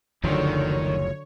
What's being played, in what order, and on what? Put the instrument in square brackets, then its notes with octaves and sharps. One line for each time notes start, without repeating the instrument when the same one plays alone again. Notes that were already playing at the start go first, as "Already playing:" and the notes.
[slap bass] F#1 D2 F3 [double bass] D3 F#3 [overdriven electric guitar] D#3 [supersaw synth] C#5